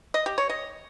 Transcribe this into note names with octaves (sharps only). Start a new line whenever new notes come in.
D#5
G4
C#5
D#5